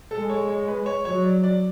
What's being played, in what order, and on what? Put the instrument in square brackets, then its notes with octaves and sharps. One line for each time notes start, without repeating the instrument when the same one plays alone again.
[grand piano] A4
[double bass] G#3
[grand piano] C#5
C#5
B4
C#5
[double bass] F#3 [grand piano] C#5
[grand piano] D5
D5